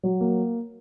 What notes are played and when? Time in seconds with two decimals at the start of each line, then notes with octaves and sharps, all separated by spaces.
0.03 F#3
0.21 A#3